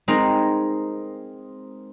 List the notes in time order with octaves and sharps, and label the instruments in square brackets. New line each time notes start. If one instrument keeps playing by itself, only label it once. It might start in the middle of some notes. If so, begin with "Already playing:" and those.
[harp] G#3 C4 D#4 G#4 A#4